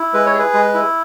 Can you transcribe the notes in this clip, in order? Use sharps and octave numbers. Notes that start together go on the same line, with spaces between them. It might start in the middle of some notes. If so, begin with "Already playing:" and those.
Already playing: E4
G#3 B4
C#5
G#4
B4
G#3
E4